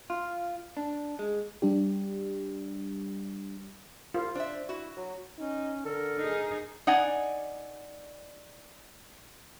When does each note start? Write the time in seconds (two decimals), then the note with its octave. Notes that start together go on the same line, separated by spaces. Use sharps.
0.10 F4
0.77 D4
1.19 G#3
1.62 G3 D4 G4
4.14 C2 F4
4.35 D4 C5 E5
4.69 E4 F#4
4.97 F#3
5.39 C#4 D#4
5.85 D3 A4 A#4
6.19 D#4 G#4
6.87 D#4 D5 F#5 G#5